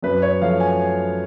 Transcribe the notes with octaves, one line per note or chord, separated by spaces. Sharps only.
F#2 B4
C#5
F3 A3 F5
G#5